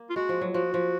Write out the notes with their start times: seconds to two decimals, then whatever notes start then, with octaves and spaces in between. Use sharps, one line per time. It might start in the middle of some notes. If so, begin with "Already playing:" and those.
Already playing: A#3
0.10 F4
0.16 G#3 F#4
0.29 F3
0.41 F#3
0.54 F3 F#4
0.74 F3